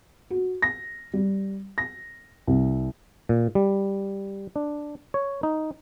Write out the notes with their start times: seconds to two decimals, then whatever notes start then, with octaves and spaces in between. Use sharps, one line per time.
0.30 F#4
0.62 A#6
1.13 G3
1.78 A#6
2.47 C2
3.29 A#2
3.55 G3
4.56 D4
5.14 C#5
5.43 D#4